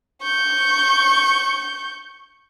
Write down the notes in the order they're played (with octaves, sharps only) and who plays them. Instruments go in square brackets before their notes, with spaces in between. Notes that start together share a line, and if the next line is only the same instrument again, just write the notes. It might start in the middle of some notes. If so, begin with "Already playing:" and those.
[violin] C#6 G6